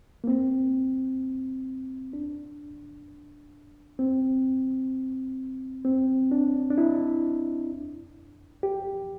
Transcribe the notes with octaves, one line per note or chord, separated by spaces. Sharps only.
A#3
C4
D4
C4
C4
D4
D4
E4
G4